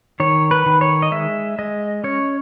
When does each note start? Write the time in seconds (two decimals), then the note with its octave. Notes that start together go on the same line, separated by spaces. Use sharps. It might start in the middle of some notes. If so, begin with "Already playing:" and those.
0.20 D#3 C#5
0.51 B4
0.66 D#3
0.81 C#5
1.02 D#5
1.11 G#3 E5
1.58 G#3 D#5
2.04 C#4 C#5